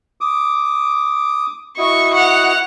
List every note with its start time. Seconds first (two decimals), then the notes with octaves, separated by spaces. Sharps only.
0.21 D6 D#6
1.78 E4 F#4 D#5 C#6
2.15 F#5 F7